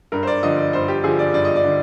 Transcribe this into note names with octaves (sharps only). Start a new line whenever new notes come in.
G2 A#4
C5
D5
D3 F3 D#5
D5
G2 C5
G4
D3 F3 G#4
D5
G2 D5
D#5
D5
D3